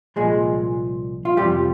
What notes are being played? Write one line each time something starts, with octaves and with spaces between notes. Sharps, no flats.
C2 A#2 F3 G#3 G#4
F4
F2 C3 F3 G3 G4